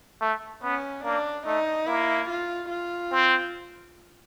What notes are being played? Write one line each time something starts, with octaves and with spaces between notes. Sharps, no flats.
A3
B3 C#4
A#3 D4
A3 D#4
A#3 E4
F4
F4
C4